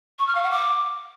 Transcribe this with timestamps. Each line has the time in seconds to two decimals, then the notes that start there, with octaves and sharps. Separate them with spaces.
0.19 C#6
0.27 F6
0.35 F5
0.43 F#5
0.51 D6